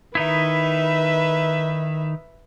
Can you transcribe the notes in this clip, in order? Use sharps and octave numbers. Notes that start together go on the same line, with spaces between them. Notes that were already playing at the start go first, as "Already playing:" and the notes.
D#3 D#4 E4 B4 E5